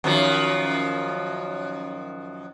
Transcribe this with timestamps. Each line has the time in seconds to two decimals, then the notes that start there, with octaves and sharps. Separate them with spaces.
0.04 F#2 D#3 F3